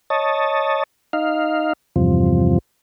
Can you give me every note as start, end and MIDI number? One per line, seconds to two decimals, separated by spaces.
0.10 0.83 73
0.10 0.83 75
0.10 0.83 81
1.13 1.73 63
1.13 1.73 77
1.96 2.58 40
1.96 2.58 43
1.96 2.58 48
1.96 2.58 53